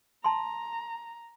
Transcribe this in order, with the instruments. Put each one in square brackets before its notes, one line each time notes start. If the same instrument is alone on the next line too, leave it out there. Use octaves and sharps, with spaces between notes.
[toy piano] A5 C6 [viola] A#5